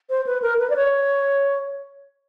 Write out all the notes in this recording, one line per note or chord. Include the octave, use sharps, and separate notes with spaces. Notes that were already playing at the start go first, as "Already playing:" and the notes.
C5
B4
A#4
B4
D5
C#5